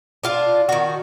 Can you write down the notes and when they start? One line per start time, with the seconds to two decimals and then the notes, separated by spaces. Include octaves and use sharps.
0.24 D4 F4 F5
0.69 D#3 F#4